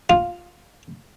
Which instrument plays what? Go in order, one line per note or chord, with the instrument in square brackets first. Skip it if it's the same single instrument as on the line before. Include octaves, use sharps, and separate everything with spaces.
[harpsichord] F4